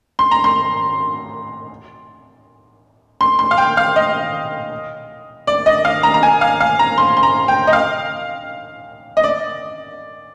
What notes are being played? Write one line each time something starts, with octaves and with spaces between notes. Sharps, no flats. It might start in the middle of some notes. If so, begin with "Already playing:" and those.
C6
A#5
C6
C6
C6
F5
G5
F5
D#5
D5
D#5
F5
A#5
A#5
G#5
F5
F5
A#5
C6
C6
A#5
G5
D#5
F5
D#5
D5